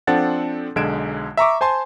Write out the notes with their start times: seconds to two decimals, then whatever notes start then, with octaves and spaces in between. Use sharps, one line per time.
0.07 F3 C4 D4 A4 F#5 A6
0.76 B1 D3 G#3 G#6 D7 E7
1.37 E5 A#5 C#6 D6
1.61 C5 G#5 A5 C6